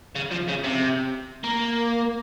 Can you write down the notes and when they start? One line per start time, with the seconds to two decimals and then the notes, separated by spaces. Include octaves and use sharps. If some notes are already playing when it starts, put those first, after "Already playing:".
0.15 C#3
0.31 F3
0.48 C#3
0.64 C3
1.44 A#3